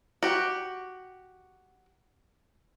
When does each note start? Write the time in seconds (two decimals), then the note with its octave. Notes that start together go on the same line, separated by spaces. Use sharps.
0.23 F#4 G4